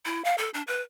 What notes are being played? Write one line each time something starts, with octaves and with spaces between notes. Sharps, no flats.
E4
F5
A4
D4
B4